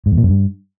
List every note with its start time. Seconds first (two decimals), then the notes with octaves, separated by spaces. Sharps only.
0.06 G#2
0.12 E2
0.17 A#2
0.23 F#2
0.29 G2